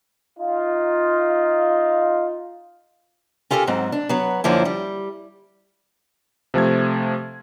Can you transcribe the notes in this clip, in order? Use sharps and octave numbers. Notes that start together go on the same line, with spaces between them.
D#4 F4
C#4 F4 G4 A4 A#4
G#2 F#3 C4
D4
F#3 B3
F#2 D3 F3 A#3 E4
G3
C3 F3 A3 G#6